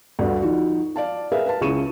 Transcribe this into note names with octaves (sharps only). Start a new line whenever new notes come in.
D2 G2 D3
F3 D#4 F#4
D5 F5 A5
G#4 A#4 B4 E5 F5
B4 F5 A5
C#2 C#3 E4 C#6 D#7 E7